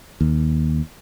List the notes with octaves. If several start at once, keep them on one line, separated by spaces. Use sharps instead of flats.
D#2